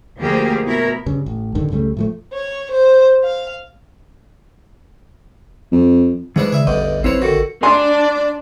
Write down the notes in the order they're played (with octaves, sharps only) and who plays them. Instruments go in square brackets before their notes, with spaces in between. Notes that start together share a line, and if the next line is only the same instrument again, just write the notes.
[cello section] D2 F3 A#3 G4 G#4
B2 E4 A#4
[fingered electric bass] G2 C#3
A1
D1 G2 D3 D#3
C#2 C#3 G3 A3
A2 F3 A3
[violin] C#5
C5
F5
[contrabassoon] F2
[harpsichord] G#2 D4 B4 [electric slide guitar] E3 G#3 D5
[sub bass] C#3 [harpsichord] E5 G#5
[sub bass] A1 [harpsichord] E2 G2 D3 [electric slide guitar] D#5
[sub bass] A1 [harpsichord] F3 B4 [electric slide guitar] C4 E4 C#5
[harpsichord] D3 D#3 [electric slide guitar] F#4 A4
[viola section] D4 [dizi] D5 [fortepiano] G#5 A#5 C6